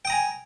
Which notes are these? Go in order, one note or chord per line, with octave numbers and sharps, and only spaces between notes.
G5 G#5 A#5 D#6